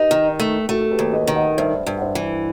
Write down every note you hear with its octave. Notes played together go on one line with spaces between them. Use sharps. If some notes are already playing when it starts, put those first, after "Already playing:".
Already playing: D#4 G4 B4
D#3
A3
A3 F#4 A4
A4
G4 B4
D#2
B4 D#5
D#3
D#5 F#5
G2 C5 E5
G2
F#5
C5 E5
E3